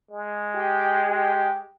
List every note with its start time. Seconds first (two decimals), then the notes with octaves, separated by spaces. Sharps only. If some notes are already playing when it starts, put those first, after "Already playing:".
0.10 G#3
0.57 G4
1.08 G4